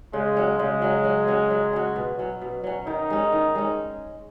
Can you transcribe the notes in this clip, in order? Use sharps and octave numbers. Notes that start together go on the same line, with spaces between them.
C#3 G#3
F#3 C#4
C#3 G#3
F#3 C#4
F#3
C#4 F#4
F#3
C#4 F#4
B2
F#3 C#4
B2
F#3 C#4
D#3 D#4
G#3 C#4
D#3
G#3 C#4